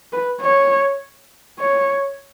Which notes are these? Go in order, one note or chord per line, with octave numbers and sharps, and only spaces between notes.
B4
C#5
C#5